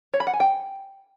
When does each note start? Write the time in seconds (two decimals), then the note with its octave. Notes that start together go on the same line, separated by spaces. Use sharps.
0.14 C#5
0.20 B5
0.27 F#5
0.33 G#5
0.40 G5